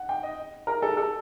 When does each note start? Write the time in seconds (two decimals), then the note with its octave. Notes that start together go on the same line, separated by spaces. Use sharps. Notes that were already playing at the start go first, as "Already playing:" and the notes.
Already playing: F#5
0.09 G5
0.23 D#5
0.67 A#4
0.82 A4
0.97 A4